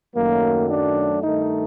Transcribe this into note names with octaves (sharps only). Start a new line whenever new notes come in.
F#2 D#3 F#3 A3 A#3
D4
G2 D#3 A3 D#4